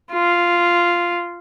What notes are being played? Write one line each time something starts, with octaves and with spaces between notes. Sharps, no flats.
F4